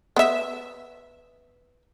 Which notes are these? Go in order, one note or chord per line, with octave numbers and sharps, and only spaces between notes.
B3 E5